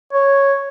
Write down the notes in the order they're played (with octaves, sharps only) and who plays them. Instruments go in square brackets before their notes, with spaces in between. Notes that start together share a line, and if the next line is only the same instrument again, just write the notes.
[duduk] C#5